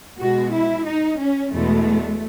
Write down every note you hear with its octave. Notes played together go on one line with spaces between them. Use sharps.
B2 G#3 F#4
E4
D#4
C#4
E2 B2 G#3 A3